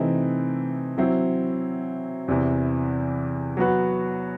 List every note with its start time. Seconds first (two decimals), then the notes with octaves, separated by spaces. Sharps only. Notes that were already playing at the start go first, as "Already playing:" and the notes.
Already playing: C3 E3 A3 C4 D#4
0.98 F#3 C4 E4
2.28 E2 C3 E3
3.57 F#3 B3 F#4 B4